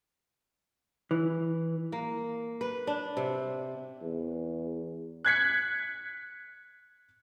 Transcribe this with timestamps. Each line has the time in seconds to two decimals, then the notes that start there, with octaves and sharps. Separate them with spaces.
1.11 E3
1.92 A#3
2.61 B4
2.87 D4
3.17 C3
4.02 E2
5.25 F#6 G#6 B6 C#7